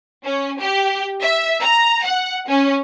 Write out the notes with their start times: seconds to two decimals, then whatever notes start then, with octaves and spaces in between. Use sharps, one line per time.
0.24 C#4
0.61 G4
1.21 E5
1.62 A#5
2.04 F#5
2.48 C#4